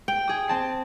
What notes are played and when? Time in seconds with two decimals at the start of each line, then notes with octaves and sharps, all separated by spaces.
0.08 G5
0.28 G#4 D#6
0.48 C4 A5 C7